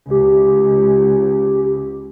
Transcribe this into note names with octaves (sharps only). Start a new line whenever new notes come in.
C#2 G4